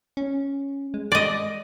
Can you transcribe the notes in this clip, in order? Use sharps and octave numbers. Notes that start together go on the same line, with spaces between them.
C#4
G#3
D5 D#5